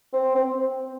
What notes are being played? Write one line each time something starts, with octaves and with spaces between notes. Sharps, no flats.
C4
C4